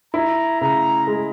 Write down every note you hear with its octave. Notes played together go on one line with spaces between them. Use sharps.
E4 A#5
C#3 A#5
G#3